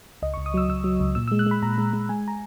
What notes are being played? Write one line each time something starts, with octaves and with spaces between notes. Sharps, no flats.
C#2 D#5
C#2 C#6
D#6
F#3 E6
C#2 E6
F#3
C#2
A#2 E6
G#3 E6
F#6
G#3 B5
A#2 A#5
G#3
G#3
G#3 G#5
A#5